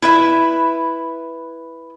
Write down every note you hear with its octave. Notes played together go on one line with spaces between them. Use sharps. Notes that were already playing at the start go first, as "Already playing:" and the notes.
E4 B4 E5